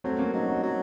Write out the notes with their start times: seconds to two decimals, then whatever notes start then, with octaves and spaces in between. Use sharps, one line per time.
0.04 F#3 A3 C4
0.18 A#3 C#4
0.33 F#3 C4 D#4
0.48 D#4 F#4
0.63 F#3